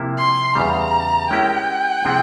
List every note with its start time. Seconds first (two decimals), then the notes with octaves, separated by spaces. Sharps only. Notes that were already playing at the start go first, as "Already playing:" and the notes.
Already playing: C3 F3 A#3 E4
0.18 C6
0.55 E2 C#3 G3 A#5
1.30 G#3 C#4 E4 G4 A#4 G5
2.05 C3 F3 C4 E4 G#4